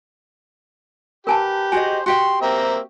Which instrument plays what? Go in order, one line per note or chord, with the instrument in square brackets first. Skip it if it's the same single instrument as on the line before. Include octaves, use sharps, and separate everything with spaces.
[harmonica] G4 [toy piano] A#4 G#5 A5 [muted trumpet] B4
[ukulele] F#4 G#4 D#5 [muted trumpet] C5 [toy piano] G#5
[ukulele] F#4 G4 G5 [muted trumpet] C6
[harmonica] A#3 C4 E5 [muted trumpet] A#5